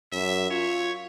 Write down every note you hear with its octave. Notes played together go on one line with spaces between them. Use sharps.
F#2 E5
F4 C#5